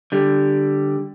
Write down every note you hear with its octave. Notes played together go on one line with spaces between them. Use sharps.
D3 G3